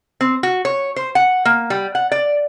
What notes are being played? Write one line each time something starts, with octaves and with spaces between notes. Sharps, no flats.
C4
F#4
C#5
C5
F#5
A#3
G3
F#5
D5